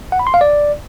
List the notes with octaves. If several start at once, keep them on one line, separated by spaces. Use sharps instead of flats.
F#5
B5
C6
F5
D5